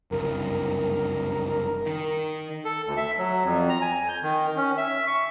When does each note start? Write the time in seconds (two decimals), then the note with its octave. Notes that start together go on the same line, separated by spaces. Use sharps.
0.11 F#1 C2 G2 A#4
1.86 D#3
2.65 A4
2.86 D2
2.97 E5
3.18 F#3
3.44 F2
3.69 A#5
3.82 G#5
4.09 G6
4.23 D#3
4.57 C#4
4.78 E5
5.07 C#6